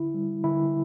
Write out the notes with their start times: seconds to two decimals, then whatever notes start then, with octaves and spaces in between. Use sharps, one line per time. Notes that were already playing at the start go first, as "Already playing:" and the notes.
Already playing: D3 E4
0.14 G3
0.44 D3 E4